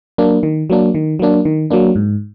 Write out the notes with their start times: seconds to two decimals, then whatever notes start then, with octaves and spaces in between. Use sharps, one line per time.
0.18 F#3 A#3 D4
0.43 D#3
0.70 F#3 A#3 D4
0.95 D#3
1.19 F#3 A#3 D4
1.45 D#3
1.70 F#3 A#3 D4
1.95 G#2